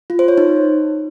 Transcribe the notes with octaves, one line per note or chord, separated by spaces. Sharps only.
F4
C5
C#5
D#4